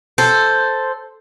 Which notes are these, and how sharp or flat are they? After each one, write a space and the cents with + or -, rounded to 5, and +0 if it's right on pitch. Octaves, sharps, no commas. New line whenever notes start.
A4 +0 C5 +0